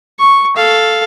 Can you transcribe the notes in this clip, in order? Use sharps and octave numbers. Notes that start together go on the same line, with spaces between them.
C#6
A4 F5